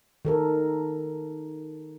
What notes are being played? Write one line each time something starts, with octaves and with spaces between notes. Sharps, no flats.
D#3 A4 A#4